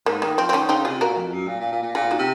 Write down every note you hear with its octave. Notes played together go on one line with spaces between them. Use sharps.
G#2 A#3
D#3 A#3
F3 C4
C4
D#3 A#3 C#4
C#3 C4 D#4
C3 F4 G#4
A#2 F#4 A#4
F2
F#2
A#2
A#2
A#2
A#2
A#2 F4 G#4
D#4 F#4
C3